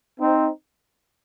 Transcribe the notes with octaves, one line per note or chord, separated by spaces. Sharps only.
C4 D#4